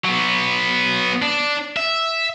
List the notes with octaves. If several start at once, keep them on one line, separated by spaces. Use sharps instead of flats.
F#3 B3
D4
E5